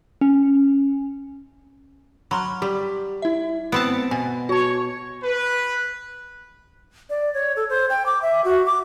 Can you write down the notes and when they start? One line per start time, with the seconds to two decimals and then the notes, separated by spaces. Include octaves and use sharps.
0.21 C#4
2.31 F#3 B5 C6 F6
2.62 G3 G4
3.22 E4 E5
3.72 B3 C4 A5 C#7 D7
4.11 B2 G#5
4.49 F#4 C#5 A5
5.23 B4
7.10 D5
7.34 C#5
7.56 A4
7.69 C5
7.90 G5
8.06 D6
8.22 E5
8.44 F#4
8.66 D6